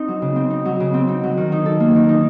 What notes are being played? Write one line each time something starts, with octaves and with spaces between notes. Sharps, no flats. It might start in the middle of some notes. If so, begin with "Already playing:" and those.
Already playing: C4 D#4
F#3
C#3
C4
D#4
F#3
C#3
C4
D#4
F#3
D#3
D#4
A4
A#3
D#3
D#4